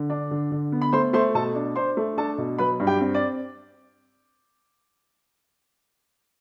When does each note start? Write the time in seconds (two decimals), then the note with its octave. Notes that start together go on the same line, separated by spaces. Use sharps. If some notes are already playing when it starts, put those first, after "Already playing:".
Already playing: D3
0.10 D4
0.31 D3
0.52 D3
0.72 B3
0.81 B5
0.93 A3 C5 C6
1.13 A3 C5 C6
1.35 B2 A4 A5
1.55 D4
1.76 D4 C5 C6
1.97 A3
2.17 D4 A4 A5
2.38 B2
2.58 F#3 B4 B5
2.80 G2
2.87 G4 G5
3.01 C4
3.14 D5